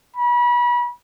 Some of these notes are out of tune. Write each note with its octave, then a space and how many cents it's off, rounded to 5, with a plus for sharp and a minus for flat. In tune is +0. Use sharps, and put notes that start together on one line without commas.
B5 -30